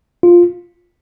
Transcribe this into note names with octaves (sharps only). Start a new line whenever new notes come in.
F4